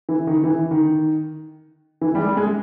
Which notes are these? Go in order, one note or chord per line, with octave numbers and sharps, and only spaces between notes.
E3
D#3
E3
D#3
E3
G3
G#3
G#3